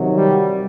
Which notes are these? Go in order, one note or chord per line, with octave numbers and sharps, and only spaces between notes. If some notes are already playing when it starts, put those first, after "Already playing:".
Already playing: C3 D#3 F#3
G3